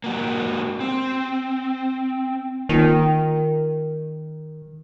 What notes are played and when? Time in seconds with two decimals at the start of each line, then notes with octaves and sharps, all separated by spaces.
0.04 A#3 F#4 G4
0.80 C4
2.69 D#3 A#3 D#4 F4